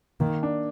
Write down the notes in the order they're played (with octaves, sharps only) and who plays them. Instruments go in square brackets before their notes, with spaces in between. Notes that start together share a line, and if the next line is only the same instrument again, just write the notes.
[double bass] D#3 [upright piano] A#3
[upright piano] D4